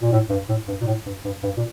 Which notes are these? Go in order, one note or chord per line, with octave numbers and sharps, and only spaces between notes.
A#2
A2
G2
A2
G2
A#2
A2
G2
G2
G2
A#2